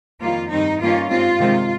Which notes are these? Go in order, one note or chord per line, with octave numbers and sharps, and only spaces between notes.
F2 D#3 G3 A#3 F4
G2 D#3 G3 C4 D#4
G2 D#3 A#3 C#4 F4
G#2 G3 C4 F4
C3 D#3 G#3